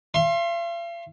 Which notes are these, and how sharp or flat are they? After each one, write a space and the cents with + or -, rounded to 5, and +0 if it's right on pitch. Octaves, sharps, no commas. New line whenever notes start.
F5 -45 C6 +25